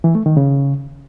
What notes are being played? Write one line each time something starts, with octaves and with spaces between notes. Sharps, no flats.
E3
A3
D#3
C#3